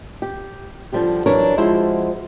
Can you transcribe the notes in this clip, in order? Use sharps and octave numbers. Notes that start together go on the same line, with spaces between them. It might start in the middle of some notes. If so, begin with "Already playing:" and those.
G4
D3 F3 G3 G4
E3 F#3 D4 A#4 C#5
F3 G#3 E4 F#4 C5